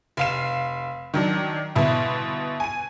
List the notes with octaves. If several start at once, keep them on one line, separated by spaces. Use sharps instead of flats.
F1 F5 E7
D#3 F#3 D4
G1 B2 E4
G#5 D#7